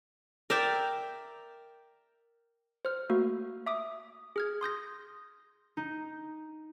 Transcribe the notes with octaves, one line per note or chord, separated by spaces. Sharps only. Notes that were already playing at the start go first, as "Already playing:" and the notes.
A#4 D5 E5 G5
C5 F6
A3 A#3 F#4
E5 D6 D#6
G#4 F6 G#6
C6 D#6 G6 A#6
D#4